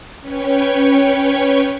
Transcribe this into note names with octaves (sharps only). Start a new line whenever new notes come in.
C#4 B4 C#5 G5 C#6